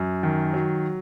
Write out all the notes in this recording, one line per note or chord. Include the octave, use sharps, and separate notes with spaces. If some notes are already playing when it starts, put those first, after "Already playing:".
Already playing: F#2
D#3
F#3